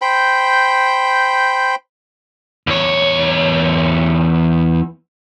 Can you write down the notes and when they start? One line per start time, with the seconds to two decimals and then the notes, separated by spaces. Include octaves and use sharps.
0.02 C5 G5 B5
2.67 E2 C#5